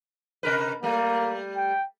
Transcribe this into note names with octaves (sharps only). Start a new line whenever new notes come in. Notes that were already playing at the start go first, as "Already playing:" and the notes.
C3 A#4 B4
G3 A3 A#3
G5